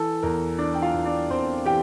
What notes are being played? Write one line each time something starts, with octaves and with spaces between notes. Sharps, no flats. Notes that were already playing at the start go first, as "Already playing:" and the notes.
Already playing: E3 A4
E2 A#4
E3 D4 D5
G5
F4 F5
E2
D4 D5
E2 C4 C5
E3 G4 G5